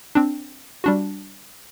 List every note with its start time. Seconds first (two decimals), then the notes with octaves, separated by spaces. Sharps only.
0.15 C4 D4
0.84 G3 D4 F#4